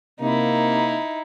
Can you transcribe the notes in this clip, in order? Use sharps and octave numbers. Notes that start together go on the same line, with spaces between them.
C3 A#3 D#4 E4